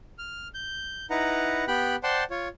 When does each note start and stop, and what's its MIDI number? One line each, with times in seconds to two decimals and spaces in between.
0.18 0.48 89
0.54 1.06 91
1.10 1.65 63
1.10 1.65 64
1.10 1.65 71
1.10 1.65 78
1.10 1.65 82
1.68 1.96 59
1.68 1.96 67
1.68 1.96 79
1.68 1.96 83
1.68 1.96 90
2.03 2.24 72
2.03 2.24 74
2.03 2.24 78
2.03 2.24 79
2.03 2.24 81
2.03 2.24 84
2.30 2.48 65
2.30 2.48 73